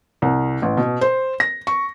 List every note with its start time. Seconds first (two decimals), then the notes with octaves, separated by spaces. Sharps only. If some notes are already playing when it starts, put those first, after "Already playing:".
0.22 C2
0.62 A1
0.77 B2
1.01 C5
1.40 A#6
1.67 C#6